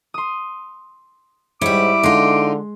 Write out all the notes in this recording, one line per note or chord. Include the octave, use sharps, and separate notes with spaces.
C6 D#6
G#2 G3 E4 C#5 D6
D3 G#3 D#4 F4 C6 C7